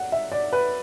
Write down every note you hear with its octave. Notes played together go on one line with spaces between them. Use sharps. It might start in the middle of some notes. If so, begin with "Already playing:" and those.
Already playing: F#5
E5
D5
B4